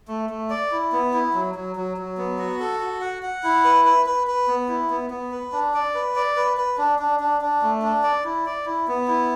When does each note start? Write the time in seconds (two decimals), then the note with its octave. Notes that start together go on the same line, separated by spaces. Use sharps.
0.08 A3
0.30 A3
0.50 D5
0.72 E4
0.92 B3
1.13 E4
1.34 F#3
1.55 F#3
1.76 F#3
1.97 F#3
2.17 B3
2.39 F#4
2.60 A4
2.80 F#4
3.01 F#5
3.22 F#5
3.43 E4
3.64 B4
3.85 B4
4.06 B4
4.27 B4
4.48 B3
4.68 E4
4.90 B3
5.10 B3
5.31 B4
5.52 D4
5.74 D5
5.94 B4
6.16 D5
6.36 B4
6.57 B4
6.78 D4
6.99 D4
7.20 D4
7.41 D4
7.62 A3
7.82 D4
8.03 D5
8.24 E4
8.46 D5
8.66 E4
8.88 B3
9.08 E4